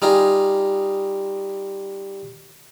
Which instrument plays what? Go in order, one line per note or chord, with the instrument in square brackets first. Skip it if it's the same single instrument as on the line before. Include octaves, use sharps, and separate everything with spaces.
[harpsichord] G3 D#4 F4 G#4